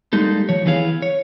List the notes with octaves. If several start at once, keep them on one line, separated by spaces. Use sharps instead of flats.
G3 G#3 A#3 D#4 A4
F3 C#5
E3 B3 E4 G#4 F5
C#5